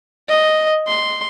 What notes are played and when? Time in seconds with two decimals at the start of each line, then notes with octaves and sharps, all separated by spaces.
0.29 D#5
0.88 C6